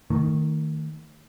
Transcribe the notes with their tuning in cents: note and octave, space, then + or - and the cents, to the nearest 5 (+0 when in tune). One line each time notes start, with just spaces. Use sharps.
D#3 +0 A3 +30